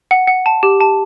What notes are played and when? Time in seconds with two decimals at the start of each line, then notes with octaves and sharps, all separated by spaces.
0.11 F#5
0.28 F#5
0.46 A5
0.63 G4
0.80 A5